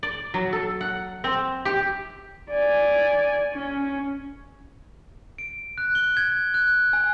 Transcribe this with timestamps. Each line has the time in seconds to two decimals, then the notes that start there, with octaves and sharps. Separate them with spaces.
0.03 D5
0.34 F#3
0.53 A4
0.81 F#5
1.24 C4
1.65 G4
2.50 D5 G#5
3.54 C#4
5.38 D7
5.78 F#6
5.95 G7
6.17 G#6
6.54 F#6
6.93 G#5